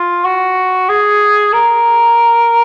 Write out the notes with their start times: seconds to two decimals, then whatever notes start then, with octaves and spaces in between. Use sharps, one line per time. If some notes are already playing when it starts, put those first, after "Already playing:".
Already playing: F4
0.24 F#4
0.89 G#4
1.53 A#4